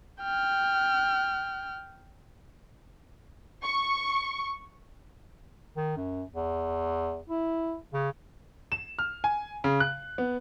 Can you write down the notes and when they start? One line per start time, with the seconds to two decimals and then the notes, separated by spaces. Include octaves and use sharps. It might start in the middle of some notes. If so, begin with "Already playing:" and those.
0.22 G5 F6
3.63 C#6
5.77 D#3
5.97 F#2
6.35 E2
7.29 E4
7.94 C#3
8.72 E7
8.99 F6
9.24 G#5
9.64 C#3
9.80 F#6
10.18 B3